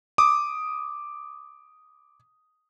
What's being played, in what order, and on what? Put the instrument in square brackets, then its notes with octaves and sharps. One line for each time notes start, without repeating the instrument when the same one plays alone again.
[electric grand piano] D6 D#6